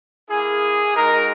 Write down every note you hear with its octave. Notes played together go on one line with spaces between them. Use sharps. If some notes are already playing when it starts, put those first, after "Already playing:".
A#3 E4 G#4
G#3 D#4 F#4 A#4